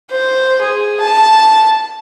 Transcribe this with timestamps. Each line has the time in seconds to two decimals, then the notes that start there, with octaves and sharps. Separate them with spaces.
0.11 C5
0.62 G#4
1.00 A5